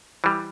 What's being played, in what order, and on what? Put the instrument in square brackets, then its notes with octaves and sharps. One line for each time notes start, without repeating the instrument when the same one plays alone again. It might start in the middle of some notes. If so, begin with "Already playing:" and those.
[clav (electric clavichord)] E3 G3